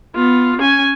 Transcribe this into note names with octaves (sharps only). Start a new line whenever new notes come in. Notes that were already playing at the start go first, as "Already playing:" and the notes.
B3 F4
C#4 G#5